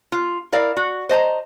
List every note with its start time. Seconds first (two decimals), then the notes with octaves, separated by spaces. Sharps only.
0.12 F4
0.52 E4 A#4 D5 F5
0.77 F#4
1.09 C5 D#5 A5 A#5